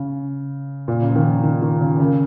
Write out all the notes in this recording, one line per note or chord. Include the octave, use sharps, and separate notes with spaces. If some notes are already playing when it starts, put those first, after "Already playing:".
Already playing: C#3
A#2
C#3
F3
D#3
D#3
D#3
C#3
C#3